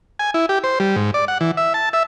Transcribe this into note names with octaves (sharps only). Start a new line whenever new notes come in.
G#5
E4
G4
C5
G3
G#2
D5
F#5
E3
E5
A5
E5